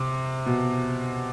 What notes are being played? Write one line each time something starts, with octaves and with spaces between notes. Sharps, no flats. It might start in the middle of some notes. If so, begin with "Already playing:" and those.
Already playing: C3
B2